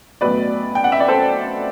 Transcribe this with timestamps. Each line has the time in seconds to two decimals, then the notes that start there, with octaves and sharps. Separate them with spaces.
0.21 B1 A2 F#3 B3 B4 D5
0.75 G5
0.84 F#5
0.92 E5
1.00 D5
1.08 A4 C5